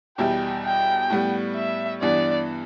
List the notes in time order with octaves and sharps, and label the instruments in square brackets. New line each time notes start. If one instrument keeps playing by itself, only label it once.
[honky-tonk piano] E2 B2 G3 E4 G4 [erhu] G5
[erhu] G5
[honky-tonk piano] A2 G3 B3
[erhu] E5
[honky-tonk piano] G2 E3 B3 [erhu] D5